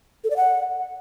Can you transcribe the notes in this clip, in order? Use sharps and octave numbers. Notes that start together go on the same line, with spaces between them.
A4
D5
F#5